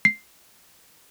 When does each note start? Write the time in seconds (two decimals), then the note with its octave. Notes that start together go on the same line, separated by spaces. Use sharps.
0.05 C7